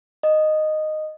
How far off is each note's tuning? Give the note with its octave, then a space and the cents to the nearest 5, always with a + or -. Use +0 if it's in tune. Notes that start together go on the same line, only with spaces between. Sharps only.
D#5 -10